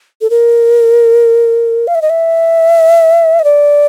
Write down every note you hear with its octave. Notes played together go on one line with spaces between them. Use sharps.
A4
A#4
F5
E5
D#5
E5
D#5
D5